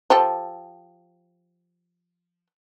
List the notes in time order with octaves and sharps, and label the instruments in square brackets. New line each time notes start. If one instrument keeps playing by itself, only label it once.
[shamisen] F3 G4 A4